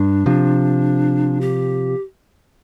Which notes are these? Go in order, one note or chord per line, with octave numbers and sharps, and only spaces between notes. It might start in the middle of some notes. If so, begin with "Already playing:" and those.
Already playing: G2 D4
C3 F3
G4